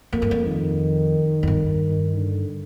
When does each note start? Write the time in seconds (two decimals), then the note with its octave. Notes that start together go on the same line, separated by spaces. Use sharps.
0.12 F2 A#3
0.22 G2
0.31 F2
0.47 D#3
1.43 F2
1.48 G2
2.15 D3